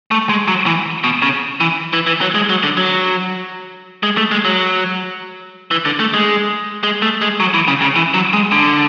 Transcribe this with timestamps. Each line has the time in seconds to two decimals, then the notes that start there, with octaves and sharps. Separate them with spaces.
0.11 A3
0.29 G#3
0.48 F#3
0.66 E3
1.04 B2
1.22 C#3
1.60 E3
1.93 E3
2.07 E3
2.21 F#3
2.35 G#3
2.49 F#3
2.63 D3
2.77 F#3
4.03 G#3
4.17 A3
4.31 G#3
4.45 F#3
5.71 E3
5.85 D3
6.00 A3
6.14 G#3
6.83 G#3
7.02 A3
7.22 G#3
7.40 F#3
7.54 E3
7.68 C#3
7.82 C#3
7.96 E3
8.14 F#3
8.33 G#3
8.52 D3